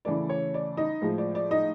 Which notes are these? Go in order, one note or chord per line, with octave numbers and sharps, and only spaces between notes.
C#3 E3 A3 D5
C#5
D5
D#4 D#5
A2 F3 G#3
D5
D5
D#4 D#5